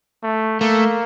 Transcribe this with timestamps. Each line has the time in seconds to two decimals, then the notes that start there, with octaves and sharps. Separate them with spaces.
0.23 A3
0.60 A3 A#3